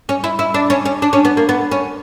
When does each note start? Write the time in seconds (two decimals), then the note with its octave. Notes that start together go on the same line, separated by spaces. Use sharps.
0.09 C#4
0.24 E4
0.39 E4
0.54 D4
0.70 C#4
0.85 C#4
1.02 D4
1.13 C#4
1.25 B3
1.37 A#3
1.49 B3
1.71 C#4